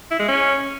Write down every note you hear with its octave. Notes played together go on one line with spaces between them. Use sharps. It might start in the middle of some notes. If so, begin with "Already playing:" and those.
E4
G#3
C#4